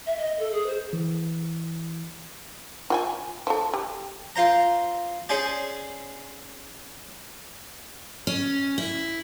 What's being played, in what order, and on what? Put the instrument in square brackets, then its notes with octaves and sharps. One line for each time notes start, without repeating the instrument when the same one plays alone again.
[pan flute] E5
D#5
A4
G#4
C5
[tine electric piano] E3
[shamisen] F4 G5 G#5
F3 A4
G4
[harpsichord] F4 C5 A#5
C#4 G#4 C5 D5
[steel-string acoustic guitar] C#4
E4